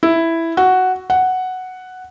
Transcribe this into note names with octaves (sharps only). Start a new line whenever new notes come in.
E4
F#4
F#5